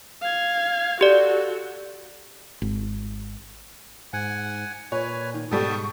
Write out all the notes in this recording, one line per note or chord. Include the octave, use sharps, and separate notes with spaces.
F5 G#6
F#4 G4 A4 D5
G#1
G#2 F#5 G#5
A#2 B4 C#5 G#5
D#3
G#2 B2 G3 A4 G5 A5 D#6
C#6